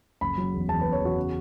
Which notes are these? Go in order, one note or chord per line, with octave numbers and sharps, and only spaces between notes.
F#1 B5
F#3
E2
E2 A5
B4
E2
C#5
E2 F#4
C#3